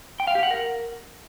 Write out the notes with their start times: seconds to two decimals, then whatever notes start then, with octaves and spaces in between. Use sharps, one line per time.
0.20 G5
0.27 F5
0.35 G4
0.43 F#5
0.51 A#4